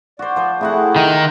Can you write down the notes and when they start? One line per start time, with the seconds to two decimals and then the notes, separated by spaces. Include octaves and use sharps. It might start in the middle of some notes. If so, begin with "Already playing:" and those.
0.19 F#4 C5 D5
0.36 F3 C5
0.61 C3 A3 E4 F#4 G#4 F#5
0.96 D#3